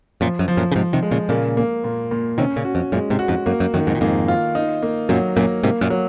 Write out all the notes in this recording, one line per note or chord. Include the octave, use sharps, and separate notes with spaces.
F#2 A#2 F3
F#2
F3
F#2 A#2
C#3
G#2 C3 F3
C3 D#3
G#3
A#2 C#3
A#2 C#3 A#3
A#3
A#2
A#2
C3 D#3 C#4
A#2 C#3
F#4
F2
F#2 A#2 G#3
G#2 C3
F#4
F2 G#2
F#2 A#3
F#2
F#2 D#3
F2 G#2
A#2
F2 G#2 A#3
F4
D#4
A#3
F#2 A#2 F#3
F#2 A#2 A#3
G#2 C3 A#3
F#2 A#2
F#3